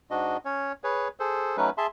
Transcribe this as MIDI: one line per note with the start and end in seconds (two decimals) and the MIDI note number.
0.11 0.37 44
0.11 0.37 62
0.11 0.37 66
0.11 0.37 75
0.45 0.72 61
0.45 0.72 73
0.84 1.08 68
0.84 1.08 71
0.84 1.08 73
1.20 1.57 68
1.20 1.57 69
1.20 1.57 72
1.57 1.70 54
1.57 1.70 57
1.57 1.70 61
1.57 1.70 63
1.57 1.70 71
1.78 1.87 68
1.78 1.87 76
1.78 1.87 81
1.78 1.87 84